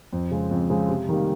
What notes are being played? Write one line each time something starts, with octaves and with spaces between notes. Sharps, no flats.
F2
C#3 G#3 C4
F2
C#3 G#3 C4
C3
D#3 G3 A#3